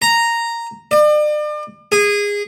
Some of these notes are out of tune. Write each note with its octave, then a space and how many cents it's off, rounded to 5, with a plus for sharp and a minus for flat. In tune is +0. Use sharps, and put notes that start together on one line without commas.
A#5 -5
D5 +40
G#4 -20